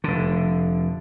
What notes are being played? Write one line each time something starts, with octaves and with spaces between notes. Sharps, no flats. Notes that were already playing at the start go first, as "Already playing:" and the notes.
F1 D3